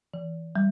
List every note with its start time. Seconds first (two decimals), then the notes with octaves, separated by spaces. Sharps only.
0.14 E3
0.56 G3